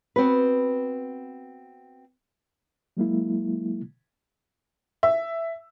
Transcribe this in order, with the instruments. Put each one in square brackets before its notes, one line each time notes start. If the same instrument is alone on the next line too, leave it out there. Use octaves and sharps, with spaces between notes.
[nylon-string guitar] B3 C4 F#4 B4
[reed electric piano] F#3 G#3 A#3 E4
[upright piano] E5